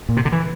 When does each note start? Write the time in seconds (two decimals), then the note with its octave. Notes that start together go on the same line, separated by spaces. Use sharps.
0.09 A#2
0.17 C3
0.25 D3
0.32 E3